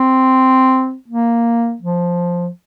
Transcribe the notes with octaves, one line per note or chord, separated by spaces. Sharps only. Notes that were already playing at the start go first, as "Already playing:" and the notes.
Already playing: C4
A#3
F3